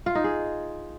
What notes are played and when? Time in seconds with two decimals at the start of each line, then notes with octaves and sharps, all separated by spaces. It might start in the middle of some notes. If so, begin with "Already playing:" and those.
0.06 F4
0.15 D#4
0.24 G#4